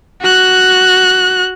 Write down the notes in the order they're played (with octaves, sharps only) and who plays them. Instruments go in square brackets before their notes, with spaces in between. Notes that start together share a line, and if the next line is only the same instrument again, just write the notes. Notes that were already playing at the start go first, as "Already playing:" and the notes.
[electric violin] F#4 F#6